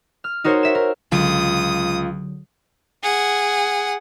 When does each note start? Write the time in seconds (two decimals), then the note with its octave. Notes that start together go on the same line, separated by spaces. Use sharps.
0.24 F6
0.44 D#4 F#4 A#4 C5 C#5
0.63 E5 E7
0.75 A#4
1.12 C#2 D3 F#3 F4 D#6
3.03 G#4 F#5